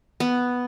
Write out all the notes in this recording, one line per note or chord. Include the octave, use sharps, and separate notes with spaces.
B3